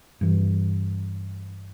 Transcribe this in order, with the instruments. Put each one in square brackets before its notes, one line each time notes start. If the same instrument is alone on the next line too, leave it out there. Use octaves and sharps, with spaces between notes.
[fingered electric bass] G2 E3